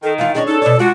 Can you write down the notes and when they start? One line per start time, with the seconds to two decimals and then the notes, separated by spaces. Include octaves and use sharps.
0.03 D#3 A4
0.18 E3 F4 F5
0.35 C#4 D4 G#4 D#5
0.47 D#4 A4
0.62 B2 C#5 D5
0.79 G#3 D4 F4 F#4